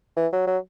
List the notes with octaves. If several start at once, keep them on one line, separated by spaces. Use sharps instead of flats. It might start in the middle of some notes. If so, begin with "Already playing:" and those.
E3
F#3
F#3